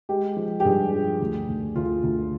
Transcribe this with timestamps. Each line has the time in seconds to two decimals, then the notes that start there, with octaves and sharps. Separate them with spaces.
0.09 G#3 G4
0.37 F3
0.60 G4
0.65 G2 G#4
0.92 F3
1.21 D2
1.48 D2
1.76 D2 F4
2.03 D2